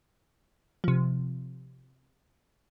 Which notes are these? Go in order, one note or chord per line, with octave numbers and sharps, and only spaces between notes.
C3 F3